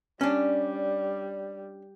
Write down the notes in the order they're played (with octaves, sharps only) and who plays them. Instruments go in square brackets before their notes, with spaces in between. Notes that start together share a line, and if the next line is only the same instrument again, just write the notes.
[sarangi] G3 [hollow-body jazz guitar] C#4 D4